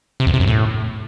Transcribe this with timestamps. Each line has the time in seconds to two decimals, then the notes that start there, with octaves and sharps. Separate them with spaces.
0.20 C3
0.27 E2
0.33 C3
0.40 F#2
0.47 A2